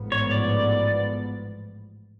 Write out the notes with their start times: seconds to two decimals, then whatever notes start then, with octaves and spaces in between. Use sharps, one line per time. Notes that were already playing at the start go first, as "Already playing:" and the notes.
Already playing: A1 G#2 F3 B3
0.12 C#5
0.31 D5